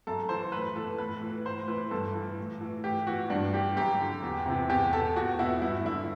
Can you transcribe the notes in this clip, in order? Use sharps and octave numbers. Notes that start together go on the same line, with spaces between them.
F#2 A4
E3 C5
A2 B4
E3 A4
A2 B4
E3
A2 C5
E3 B4
G2 A4
E3
A2
E3
A2 G4
E3 F#4
G2 D4
E3 G4
F#2 G4
D3
E2
C3 E3
E2 G4
B2 A4
E2 F#4
B2 E4
G2 E4
D3 E4